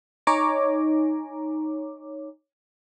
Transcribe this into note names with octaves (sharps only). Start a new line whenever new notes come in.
D#4 C#5 G#5 A#5 D6